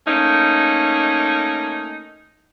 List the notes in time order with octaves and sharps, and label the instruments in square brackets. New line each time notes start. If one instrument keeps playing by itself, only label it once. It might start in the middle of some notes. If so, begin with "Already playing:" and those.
[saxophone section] A3 A#3 C#4 D#4